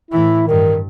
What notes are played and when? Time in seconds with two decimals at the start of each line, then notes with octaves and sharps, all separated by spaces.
0.11 A2 E3 E4
0.48 G2 D#3